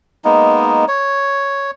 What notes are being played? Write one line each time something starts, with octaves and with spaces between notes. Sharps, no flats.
G#3 A#3 B3 D#4
C#5